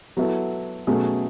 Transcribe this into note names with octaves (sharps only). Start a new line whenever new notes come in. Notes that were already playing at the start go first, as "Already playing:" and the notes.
F#3 B3 E4 A4
B2 F#3 A3 C#4 G#4